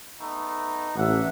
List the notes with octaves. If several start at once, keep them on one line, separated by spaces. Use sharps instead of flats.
A3 B3 D#4
A1 D4 E5 F#5